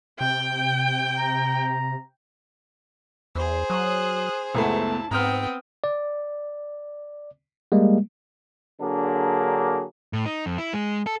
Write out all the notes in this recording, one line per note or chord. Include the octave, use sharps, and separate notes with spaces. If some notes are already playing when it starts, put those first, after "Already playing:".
C3 G5
A#5
E2 G#4 C5
F#3 D#6 F#6
C#2 F#2 A3 B3 E4 A5
G#2 B3 C4 G5 A#5 D#6 F6
D5
G3 G#3 A#3
D3 F#3 A#3 D4 G#4
A2
D#4
F2
E4
G#3
A4